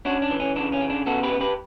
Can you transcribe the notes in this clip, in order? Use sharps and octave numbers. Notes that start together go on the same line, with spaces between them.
C#4 D4 F#4
D4
E3
C#4
C#3 D4
C#4
C#3
D4
B3 F#4 A4
G4 B4
B3
G4 B4